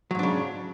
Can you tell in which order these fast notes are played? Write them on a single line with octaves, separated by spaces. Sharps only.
F#3 G#2 D4 C#3